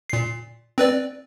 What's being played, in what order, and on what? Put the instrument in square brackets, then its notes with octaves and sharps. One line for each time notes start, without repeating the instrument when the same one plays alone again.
[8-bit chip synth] A#2 C7
C4 B4 D5